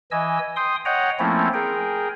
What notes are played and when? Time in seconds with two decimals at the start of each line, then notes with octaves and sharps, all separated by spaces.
0.11 E3 D#5 G#5 E6
0.56 G5 C6 D#6
0.85 C#5 D#5 F#5 G5 A#5
1.19 F3 A3 A#3 C4 C#4 E4
1.54 G#4 A#4 G5